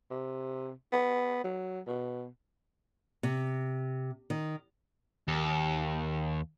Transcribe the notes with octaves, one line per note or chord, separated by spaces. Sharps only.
C3
B3
F#3
B2
C3
D#3
D#2